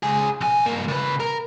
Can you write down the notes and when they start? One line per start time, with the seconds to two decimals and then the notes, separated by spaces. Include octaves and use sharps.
0.03 C#2 G#4
0.41 B1 G#5
0.66 G2 A#3
0.88 C#3 B4
1.20 A#4